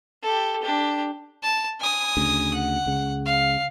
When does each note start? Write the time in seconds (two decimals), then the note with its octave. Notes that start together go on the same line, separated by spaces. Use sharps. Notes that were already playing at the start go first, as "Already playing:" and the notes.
0.22 G4 A4
0.62 D4 G4
1.43 A5
1.80 G#5 D#6
2.17 D2 C#3
2.53 F#5
2.86 C#2 C#3
3.25 F5